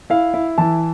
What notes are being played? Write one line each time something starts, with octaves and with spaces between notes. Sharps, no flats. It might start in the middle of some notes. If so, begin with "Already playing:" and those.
E4 F5
E4
E3 A5